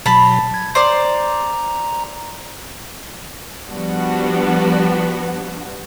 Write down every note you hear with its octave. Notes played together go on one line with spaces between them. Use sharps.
B2 F#3 A5 B5
G#6
C5 D5 A#5
F3 G3 B3 D4 F#4